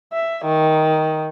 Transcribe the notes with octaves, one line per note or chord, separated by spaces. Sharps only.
E5
D#3